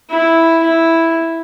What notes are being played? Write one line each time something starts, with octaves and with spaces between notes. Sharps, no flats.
E4
E4